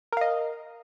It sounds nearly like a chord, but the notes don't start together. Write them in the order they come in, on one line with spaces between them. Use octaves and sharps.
A#4 F5 D#5